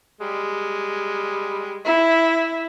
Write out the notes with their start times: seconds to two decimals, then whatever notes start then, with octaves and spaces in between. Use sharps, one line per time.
0.21 G3 G#3
1.85 E4